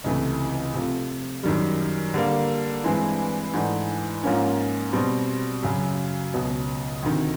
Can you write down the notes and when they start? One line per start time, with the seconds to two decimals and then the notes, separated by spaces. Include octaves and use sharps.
0.04 C#2 C3 E3 A3
0.74 C3 F3 A3
1.43 F#2 D#3 G3
2.14 D3 G3 A#3
2.84 G2 E3 G#3 C4 E4
3.54 G#2 E3 A3 D4
4.23 G#2 F3 A#3 C#4
4.93 B2 G3 C4
5.63 F#2 C#3 F#3
6.34 C#2 B2 F#3
7.03 D2 C3 D#3